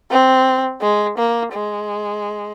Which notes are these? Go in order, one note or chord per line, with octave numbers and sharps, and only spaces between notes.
C4
G#3
A#3
G#3